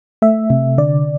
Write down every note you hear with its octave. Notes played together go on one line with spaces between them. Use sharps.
A3 E5
C3
D3 D5